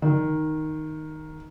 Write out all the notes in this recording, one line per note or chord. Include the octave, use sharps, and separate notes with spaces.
D#3